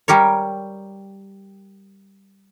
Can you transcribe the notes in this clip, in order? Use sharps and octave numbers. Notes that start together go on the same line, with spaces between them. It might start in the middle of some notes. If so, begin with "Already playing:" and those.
G3 G4 A#4 C#5